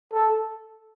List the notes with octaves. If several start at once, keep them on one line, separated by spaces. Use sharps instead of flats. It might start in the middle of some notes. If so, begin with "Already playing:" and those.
A4